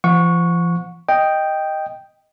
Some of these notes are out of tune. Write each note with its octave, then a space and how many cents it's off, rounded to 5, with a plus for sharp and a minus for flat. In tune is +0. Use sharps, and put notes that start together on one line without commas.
F3 -35 F#5 -35 C#6 +0
D#5 +0 G5 +0